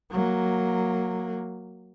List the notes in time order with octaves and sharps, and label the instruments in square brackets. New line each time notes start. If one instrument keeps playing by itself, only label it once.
[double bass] F#3 A#3